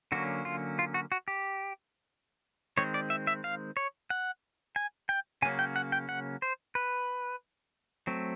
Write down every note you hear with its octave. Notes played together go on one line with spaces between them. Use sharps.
D3 F#3 A#3 C#4 F#4
F4
F4
F#4
F#4
G4
D#3 G#3 C4 C#5
D5
E5
E5
F5
C#5
F#5
G#5
G5
C#3 F#3 A#3 C#4 G#5
G5
F#5
G5
F#5
C5
B4
F#3 A3 C4